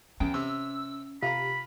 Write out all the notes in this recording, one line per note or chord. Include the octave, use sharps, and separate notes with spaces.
E2 C#4 G5
C3 E6
C3 F4 F5 A#5 B5